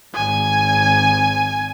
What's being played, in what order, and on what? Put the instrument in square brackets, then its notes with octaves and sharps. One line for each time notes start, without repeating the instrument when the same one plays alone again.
[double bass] G#1 [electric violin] G#5